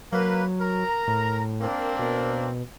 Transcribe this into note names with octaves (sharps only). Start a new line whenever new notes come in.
F#3 A#3 B4
A#4 A#5
A2
A#3 C4 D4
B2